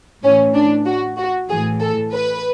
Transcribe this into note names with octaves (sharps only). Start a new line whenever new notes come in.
A2 E3 C#4
D4
F#4
F#4
A2 E3 G#4
A4
B4